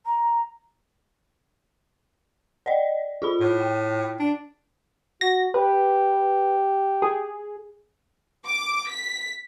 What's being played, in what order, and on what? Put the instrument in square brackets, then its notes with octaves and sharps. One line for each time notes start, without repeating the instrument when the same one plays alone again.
[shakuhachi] A#5
[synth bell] D5 D#5
F4 G#4 B5
[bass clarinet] A2
[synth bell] G5
[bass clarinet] D4
[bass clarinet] F#4 [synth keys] A#6
[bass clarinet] G4 [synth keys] B4
[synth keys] G#4
[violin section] D6
B6